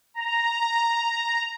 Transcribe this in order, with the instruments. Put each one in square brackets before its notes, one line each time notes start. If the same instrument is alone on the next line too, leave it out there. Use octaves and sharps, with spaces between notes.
[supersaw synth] A#5